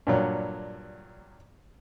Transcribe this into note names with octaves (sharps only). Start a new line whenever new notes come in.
G2 A#2 F#3